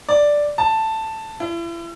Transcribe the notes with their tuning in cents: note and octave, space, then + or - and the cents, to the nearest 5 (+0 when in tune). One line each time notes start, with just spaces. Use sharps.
D5 +0
A5 +5
E4 +40